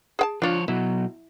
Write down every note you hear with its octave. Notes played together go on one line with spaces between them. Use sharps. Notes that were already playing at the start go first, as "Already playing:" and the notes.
G#4 G5 A5
F3 D4 F4 C#5
B2 F#3 E4